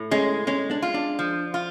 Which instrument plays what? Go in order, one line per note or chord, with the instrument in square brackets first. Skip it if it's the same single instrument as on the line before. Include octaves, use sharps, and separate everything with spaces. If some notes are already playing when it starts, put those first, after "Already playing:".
Already playing: [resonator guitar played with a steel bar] A2
[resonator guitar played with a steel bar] G#3 [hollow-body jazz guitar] C#4
[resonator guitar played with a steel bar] G#3 [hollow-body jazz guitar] C#4
[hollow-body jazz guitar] D4
[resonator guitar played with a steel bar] F4
[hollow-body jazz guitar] D4
[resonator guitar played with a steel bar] F3
F4